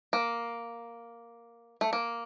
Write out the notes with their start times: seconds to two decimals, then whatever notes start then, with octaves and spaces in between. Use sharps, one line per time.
0.13 A#3
1.81 A3
1.93 A#3